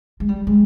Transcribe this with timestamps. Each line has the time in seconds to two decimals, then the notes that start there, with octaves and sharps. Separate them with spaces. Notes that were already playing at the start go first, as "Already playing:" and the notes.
0.20 G#3
0.29 G3
0.47 G#3